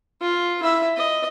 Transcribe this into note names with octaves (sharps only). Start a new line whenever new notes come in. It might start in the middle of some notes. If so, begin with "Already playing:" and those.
F4
E4 E5
D#5